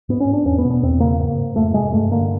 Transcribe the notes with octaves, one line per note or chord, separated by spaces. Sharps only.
G#2 B3
C#4
G#2
D4
E2 C#4
B3
B2
B3
E2 C4
C#3 A#3
G#2
G#2
F2 A3
C3 G#3
G2 A3
D3 A#3